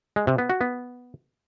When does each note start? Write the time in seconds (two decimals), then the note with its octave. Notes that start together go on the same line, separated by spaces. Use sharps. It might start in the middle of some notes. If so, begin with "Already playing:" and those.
0.16 G#3
0.27 C3
0.38 B3
0.50 F#4
0.61 B3